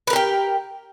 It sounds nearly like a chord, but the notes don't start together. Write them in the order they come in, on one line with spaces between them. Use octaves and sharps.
B4 A#4 G4 G5